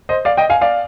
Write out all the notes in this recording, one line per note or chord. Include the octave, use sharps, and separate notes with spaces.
C5 D#5
D5 F5
D#5 G5
F5 G#5
D5 F5